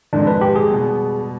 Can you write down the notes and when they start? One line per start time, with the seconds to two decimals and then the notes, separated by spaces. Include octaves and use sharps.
0.13 F2 C3 D#3 G#3 D4
0.27 B4
0.41 G4
0.56 G#4
0.70 B2 G3 B3